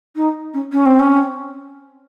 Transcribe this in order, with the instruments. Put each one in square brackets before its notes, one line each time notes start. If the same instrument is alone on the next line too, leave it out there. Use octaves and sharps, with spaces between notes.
[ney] D#4
C#4
C#4
C4
C#4